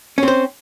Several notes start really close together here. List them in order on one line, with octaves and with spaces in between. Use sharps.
C#4 C4 C5